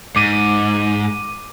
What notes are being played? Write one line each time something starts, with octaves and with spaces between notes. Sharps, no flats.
G#2 D6 D#7